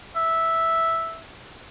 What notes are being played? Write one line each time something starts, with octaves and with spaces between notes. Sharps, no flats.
E5